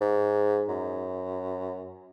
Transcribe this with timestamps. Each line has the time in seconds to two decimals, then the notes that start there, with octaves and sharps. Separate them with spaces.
0.01 G#2
0.69 F#2